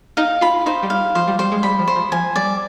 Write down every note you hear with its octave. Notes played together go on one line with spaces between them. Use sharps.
D#4 F5
F4 B5
D#4 C5
G3
F5
F3 C5
G3
G3 C5
G#3
G3 B5
F3
C5
F3
F3 G#5
G3 D5